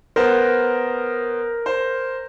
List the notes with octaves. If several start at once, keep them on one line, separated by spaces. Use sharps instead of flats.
B3 A#4 C5
C5